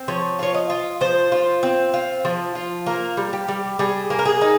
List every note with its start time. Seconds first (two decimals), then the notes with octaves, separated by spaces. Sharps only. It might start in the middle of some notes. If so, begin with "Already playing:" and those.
Already playing: C4
0.08 F3 C#5
0.39 F4 C#5
0.54 D#5
0.70 F4
1.01 F3 C5
1.32 F4
1.63 C4
1.94 F4
2.25 F3
2.55 F4
2.86 A#3 A#4
3.17 G3
3.33 G4
3.48 G3
3.79 G3 G#4
4.10 A#3
4.19 A#4
4.25 G#4
4.41 D#4